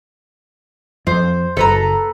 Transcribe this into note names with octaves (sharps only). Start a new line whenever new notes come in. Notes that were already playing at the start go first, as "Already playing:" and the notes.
F2 C5
F#1 A4 B4 A#5